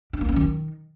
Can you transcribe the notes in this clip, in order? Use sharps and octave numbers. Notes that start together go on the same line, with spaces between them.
D4
A#3
C#4
D#3